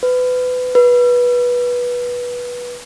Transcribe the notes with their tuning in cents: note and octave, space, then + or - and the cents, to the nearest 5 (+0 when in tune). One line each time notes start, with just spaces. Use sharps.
B4 +25
B4 -20